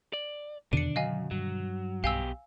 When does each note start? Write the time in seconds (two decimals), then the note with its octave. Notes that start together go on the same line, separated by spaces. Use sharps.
0.13 D5
0.73 E2 B2 D3 D#3 D4 C#7 D#7
0.96 F#2 F#3 D#5 F5 G#5
1.31 G2 F#3
2.04 B1 B2 G4 F5 G#5 E6